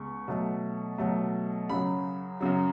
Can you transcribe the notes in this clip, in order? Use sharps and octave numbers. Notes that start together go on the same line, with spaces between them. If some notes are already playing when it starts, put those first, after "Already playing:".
Already playing: C#2 G#3 B3 C#6
B2 F#3 A3
B2 F#3 A3
F#2 C#3 F#3 B5
F#2 C#3 F#3